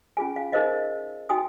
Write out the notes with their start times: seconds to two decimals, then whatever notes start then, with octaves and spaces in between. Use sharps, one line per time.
0.17 C#4 F4 G#4 G#5
0.36 F5
0.52 D#4 G#4 A#4 C5 D#5 F5
1.29 D#4 F#4 G5 G#5 D#6